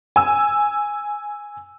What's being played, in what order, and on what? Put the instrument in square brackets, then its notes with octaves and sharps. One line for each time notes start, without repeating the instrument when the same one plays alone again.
[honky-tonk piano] G#5 E6